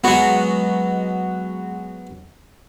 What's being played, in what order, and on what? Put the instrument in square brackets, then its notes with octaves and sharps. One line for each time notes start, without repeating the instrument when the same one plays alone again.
[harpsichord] F#3 B3 [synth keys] G#3 F#4